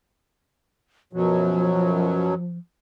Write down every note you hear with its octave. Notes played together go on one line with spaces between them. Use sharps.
F#2 B2 F3 F#3